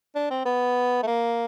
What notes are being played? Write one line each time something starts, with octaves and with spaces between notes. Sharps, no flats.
D4
C4
B3
A3
A#3